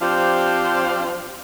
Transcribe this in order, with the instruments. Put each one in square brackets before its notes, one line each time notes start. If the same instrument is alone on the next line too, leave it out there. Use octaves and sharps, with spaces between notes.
[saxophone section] F3 C4 D4 G4 C5 F5